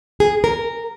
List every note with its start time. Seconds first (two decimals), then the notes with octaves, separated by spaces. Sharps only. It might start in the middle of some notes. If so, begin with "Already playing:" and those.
0.20 G#4
0.44 A#4